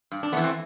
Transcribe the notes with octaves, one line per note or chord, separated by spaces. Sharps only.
G2
D4
E3 A3 B3
C4